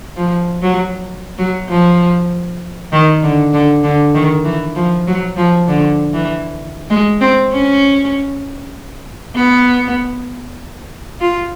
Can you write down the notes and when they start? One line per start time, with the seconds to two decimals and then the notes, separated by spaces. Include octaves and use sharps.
0.16 F3
0.62 F#3
1.38 F#3
1.69 F3
2.92 D#3
3.23 D3
3.53 D3
3.83 D3
4.14 D#3
4.45 E3
4.75 F3
5.07 F#3
5.37 F3
5.68 D3
6.13 E3
6.90 G#3
7.21 C4
7.52 C#4
9.35 B3
11.20 F4